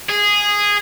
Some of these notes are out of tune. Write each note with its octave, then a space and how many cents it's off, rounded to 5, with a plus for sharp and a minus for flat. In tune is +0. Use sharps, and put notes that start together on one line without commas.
G#4 -10